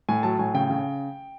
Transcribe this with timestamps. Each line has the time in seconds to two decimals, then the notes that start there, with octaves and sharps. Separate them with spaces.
0.09 A2 G#5
0.23 F#3 A5
0.39 A2 G#5
0.54 C#3 G5
0.70 C#3